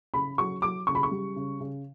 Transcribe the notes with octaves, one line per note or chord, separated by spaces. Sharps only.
C#3 B5
F#3 C#6
F#3 D6
C#3 C#6
B5
C#6
G3
C#3
C#3